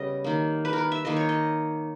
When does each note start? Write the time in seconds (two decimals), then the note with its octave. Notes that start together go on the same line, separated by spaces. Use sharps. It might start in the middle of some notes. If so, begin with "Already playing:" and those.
Already playing: C#3 G3 B3 D#5
0.24 D#3 A#3
0.65 B4
0.73 A#4
0.78 B4
0.92 E5
1.05 D#3 A#3 D#5
1.16 C#5
1.29 D#5